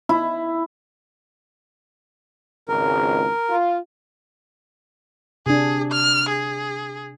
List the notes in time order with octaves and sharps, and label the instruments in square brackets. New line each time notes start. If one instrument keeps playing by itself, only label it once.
[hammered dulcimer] E4
[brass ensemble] G#1 C#2 [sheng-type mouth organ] A#4
[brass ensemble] F4
[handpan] C3 D4 [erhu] G#4
[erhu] F6
G#4